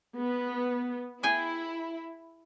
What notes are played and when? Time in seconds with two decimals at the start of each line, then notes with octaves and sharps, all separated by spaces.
0.17 B3
1.23 E4 G#4 G5 G#5